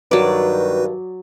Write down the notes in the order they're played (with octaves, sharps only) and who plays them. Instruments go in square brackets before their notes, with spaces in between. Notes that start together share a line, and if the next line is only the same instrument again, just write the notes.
[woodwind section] G2 D#3 [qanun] F#3 D5 [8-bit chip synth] F#4 B4